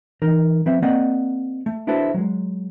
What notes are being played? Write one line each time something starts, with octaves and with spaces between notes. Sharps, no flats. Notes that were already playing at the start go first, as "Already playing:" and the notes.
E3 D#4 A#4
F3 C4 B4 E5
A#3 C4 D5 D#5 F#5
A3
D4 E4 F#4 A4 B4 C5
F#3 G#3